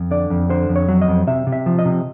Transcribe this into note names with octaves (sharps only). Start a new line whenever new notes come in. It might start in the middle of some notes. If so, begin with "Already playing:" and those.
Already playing: F2
D3 D5
F2
D3 C5
F2
C#5
F#3
D#5
F2
C3 E5
C3
E5
F3
D#5
C3